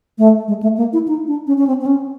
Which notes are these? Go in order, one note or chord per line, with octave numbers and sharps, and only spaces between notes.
A3
G#3
A3
A#3
E4
D#4
D4
C#4
C#4
C4
C4
C#4